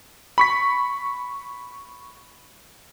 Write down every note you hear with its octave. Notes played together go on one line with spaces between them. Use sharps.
B5 C#6 B6